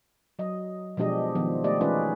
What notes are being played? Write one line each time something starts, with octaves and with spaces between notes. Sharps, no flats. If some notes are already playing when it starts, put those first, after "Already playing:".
F#3 D#5
B2 F3 G#3 D4 G4 D#5
D#3 F3 B3
A3 G4 D5 D#5
E3 G#3 C#4 D#4 F4 B4